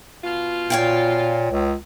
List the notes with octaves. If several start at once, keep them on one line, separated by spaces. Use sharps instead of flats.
B2 F4
A#2 C#5 F5 G5
C#2